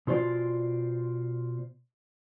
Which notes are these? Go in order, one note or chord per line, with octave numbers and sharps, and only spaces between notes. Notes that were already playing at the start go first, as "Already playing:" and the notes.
B2 F4 C5 D5